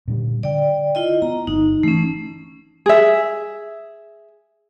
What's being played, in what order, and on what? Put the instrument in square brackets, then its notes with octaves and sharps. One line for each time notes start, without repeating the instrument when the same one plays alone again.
[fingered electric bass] A#2 D3 G3
[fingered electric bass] D3 [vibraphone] D5 G5
[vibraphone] E4 F4 D#5
[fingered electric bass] B3 [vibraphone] A#5
[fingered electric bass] G1 A#3 [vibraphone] D#4
[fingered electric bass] E3 [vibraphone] A3 C#4
[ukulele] G#4 E5